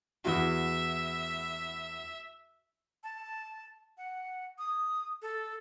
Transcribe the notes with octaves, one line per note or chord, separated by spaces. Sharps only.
E2 E4 F#4 E5
A5
F#5
D#6
A4